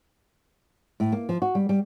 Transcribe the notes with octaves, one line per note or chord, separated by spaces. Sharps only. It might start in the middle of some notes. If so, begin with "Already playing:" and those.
A2
A#3
F3
F#4
G3
G3